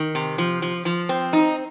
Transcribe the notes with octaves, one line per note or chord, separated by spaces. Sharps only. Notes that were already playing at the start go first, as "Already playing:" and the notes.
Already playing: D#3
C3
F3
F3
F3
C4
D#4